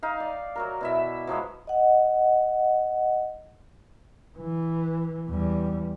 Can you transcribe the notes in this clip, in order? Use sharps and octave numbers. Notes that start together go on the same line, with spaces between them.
D#4 F5
D5
F#3 F#4 A#4
B2 E4 E5
F3 F#3 G#3 B3
D#5 F#5
E3
E2 G3